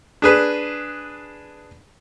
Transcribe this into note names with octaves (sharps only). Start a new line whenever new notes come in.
D4 G#4 B4